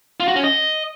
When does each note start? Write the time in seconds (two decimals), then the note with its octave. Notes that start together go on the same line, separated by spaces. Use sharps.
0.20 F4
0.28 F#4
0.36 C#4
0.44 D#5